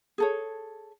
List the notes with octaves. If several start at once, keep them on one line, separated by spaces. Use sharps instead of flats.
G#4 A4 C#5